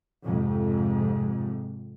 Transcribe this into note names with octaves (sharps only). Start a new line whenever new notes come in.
F2 G#2 C3